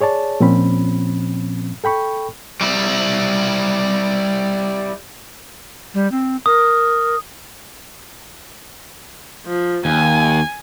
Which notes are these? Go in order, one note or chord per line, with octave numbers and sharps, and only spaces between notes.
G#4 C#5 D5 A5
A#2 F3 C4 C#4 B5
A4 G5 B5 C#6
G3 E4
G3
C4
A#4 D#6
F3
D#2 G#5